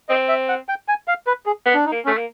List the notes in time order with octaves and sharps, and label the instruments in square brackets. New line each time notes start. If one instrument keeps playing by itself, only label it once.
[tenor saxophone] C4 [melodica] D#5
[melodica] E5
F#5
G5
G#5
F5
B4
G#4
[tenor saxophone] B3
[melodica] D4
D#4
[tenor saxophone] A#3
[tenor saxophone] A3 [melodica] C#4
[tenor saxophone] A#3